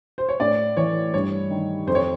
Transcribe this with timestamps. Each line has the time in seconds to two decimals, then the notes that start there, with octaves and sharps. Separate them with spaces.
0.18 C5
0.29 C#5
0.40 A2 D5
0.77 E3 C#5
1.14 G2 C#5
1.50 D#3
1.87 F2 C5
1.95 C#5